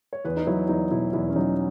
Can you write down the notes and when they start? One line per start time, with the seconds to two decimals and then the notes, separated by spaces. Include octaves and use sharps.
0.13 C#5
0.25 E2 B4
0.37 D#4
0.47 F#3 E4
0.69 E2 D#4
0.91 B2 E4
1.13 E2 E4
1.29 C#4
1.36 F#3 D#4